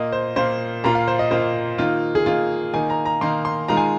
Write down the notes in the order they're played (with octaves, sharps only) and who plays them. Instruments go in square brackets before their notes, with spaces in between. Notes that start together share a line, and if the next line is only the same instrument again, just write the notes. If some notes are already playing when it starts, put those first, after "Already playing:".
Already playing: [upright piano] A#2 A#3 F4 [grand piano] D#5
[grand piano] C5
[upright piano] A#2 A#3 F4 [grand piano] C5
[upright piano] A#2 A#3 F4 [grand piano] A#5
[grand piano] F5
C5
D#5
[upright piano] A#2 A#3 F4 [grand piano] C5
[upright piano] D#3 A#3 D#4 [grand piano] F4
[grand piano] G#4
[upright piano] D#3 A#3 D#4 [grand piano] F4
[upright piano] D#3 A#3 D#4 [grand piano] G#5
[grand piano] A#5
A#5
[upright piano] D#3 A#3 D#4 [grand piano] C6
[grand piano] C6
[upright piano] D#3 G#3 F4 [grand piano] A#5
[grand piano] G#5